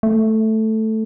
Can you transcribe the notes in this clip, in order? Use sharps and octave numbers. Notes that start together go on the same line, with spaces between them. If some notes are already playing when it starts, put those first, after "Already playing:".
A3